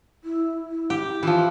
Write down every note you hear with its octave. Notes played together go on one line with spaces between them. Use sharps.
E4
E4
G4
E3 F3 F4